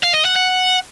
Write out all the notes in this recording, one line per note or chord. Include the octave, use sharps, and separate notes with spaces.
F5
D#5
F#5
F#5